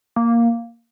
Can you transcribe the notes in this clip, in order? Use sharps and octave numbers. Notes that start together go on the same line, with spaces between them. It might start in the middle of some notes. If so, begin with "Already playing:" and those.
A#3